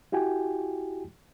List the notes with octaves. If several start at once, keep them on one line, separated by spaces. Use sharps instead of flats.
E4 F#4 G4 G5 G#5